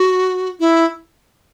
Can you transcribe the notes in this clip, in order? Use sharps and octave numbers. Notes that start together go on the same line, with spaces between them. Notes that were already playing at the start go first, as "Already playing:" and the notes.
Already playing: F#4
E4